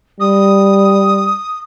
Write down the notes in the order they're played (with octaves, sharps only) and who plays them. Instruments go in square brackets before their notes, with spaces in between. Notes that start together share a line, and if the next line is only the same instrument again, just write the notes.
[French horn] G3 [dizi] D#6